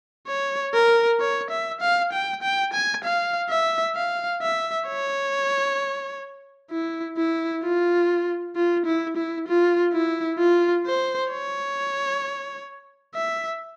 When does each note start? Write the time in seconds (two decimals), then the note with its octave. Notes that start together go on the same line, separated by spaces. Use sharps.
0.28 C#5
0.74 A#4
1.20 C#5
1.51 E5
1.81 F5
2.13 G5
2.43 G5
2.73 G#5
3.04 F5
3.50 E5
3.95 F5
4.42 E5
4.87 C#5
6.71 E4
7.17 E4
7.63 F4
8.56 F4
8.86 E4
9.17 E4
9.48 F4
9.93 E4
10.39 F4
10.86 C5
11.31 C#5
13.15 E5